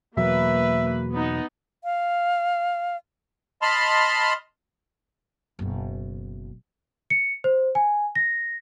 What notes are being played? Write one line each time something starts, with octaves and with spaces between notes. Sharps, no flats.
E2 B2 F#3 A#3 B4 E5
B3 D#4
F5
D#5 A5 B5 C6 F6
F#1 B2
C#7
C5
G#5
A#6